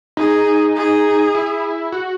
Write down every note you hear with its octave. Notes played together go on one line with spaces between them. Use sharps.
D#4 G#4
G#4
E4
F#4